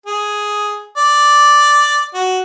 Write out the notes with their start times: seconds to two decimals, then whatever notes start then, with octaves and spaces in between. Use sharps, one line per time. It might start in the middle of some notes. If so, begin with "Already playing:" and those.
0.06 G#4
0.97 D5
2.14 F#4